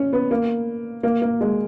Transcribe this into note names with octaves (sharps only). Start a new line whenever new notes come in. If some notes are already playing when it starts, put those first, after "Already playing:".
Already playing: C#4
B3
A#3
A#3
A#3
G#3